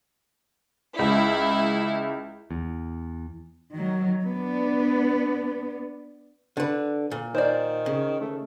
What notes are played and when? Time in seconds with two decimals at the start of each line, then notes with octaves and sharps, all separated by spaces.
0.99 C#2 E4
2.51 E2
3.73 D#3 F#3
4.24 B3 D4
6.57 D3 B4
7.11 A#2
7.35 D#3 C5 D5
7.86 C#3
8.20 A3